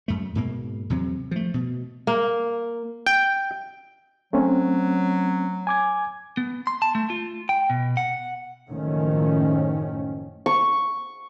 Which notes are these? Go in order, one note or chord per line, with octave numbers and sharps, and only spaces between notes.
F#2 A3
G#2 B2 A#3
E2 C3 F#3
F3 A3
B2
A#3
G5
F#3 A3 C4 C#4
G#5 D6 G#6
B3
C6
A5
A3
F4
G5
B2
F#5
F#1 A2 D#3 F3 A3 C#4
C#6